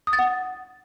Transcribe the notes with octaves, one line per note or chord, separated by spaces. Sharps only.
D#6
A6
F#5